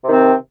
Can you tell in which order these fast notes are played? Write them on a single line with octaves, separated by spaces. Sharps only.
C3 D#3 C4